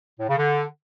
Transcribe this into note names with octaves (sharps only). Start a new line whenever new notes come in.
A2
C#3
D3